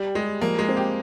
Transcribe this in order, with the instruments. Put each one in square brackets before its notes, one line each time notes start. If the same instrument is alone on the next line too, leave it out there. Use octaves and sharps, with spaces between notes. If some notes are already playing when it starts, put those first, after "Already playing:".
Already playing: [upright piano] G3 [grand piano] G4
[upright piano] G#3 [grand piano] G4
[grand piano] F3 [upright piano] A#3
[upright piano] G#3
[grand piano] C4
[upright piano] G4